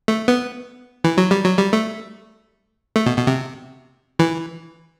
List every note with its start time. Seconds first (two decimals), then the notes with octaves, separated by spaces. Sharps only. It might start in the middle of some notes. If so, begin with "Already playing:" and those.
0.08 A3
0.28 B3
1.04 E3
1.18 F#3
1.31 G3
1.45 F#3
1.59 G3
1.73 A3
2.96 A3
3.06 B2
3.17 B2
3.27 C3
4.19 E3